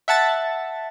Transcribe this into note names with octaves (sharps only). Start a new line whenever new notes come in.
E5 F#5 A5 A6